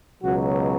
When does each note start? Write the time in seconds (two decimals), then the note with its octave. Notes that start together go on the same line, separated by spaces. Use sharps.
0.23 C#2 B2 F#3 F#4